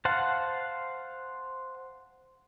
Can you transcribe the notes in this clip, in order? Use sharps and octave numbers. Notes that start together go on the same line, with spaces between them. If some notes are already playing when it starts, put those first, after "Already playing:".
C5 F5 F#5 A5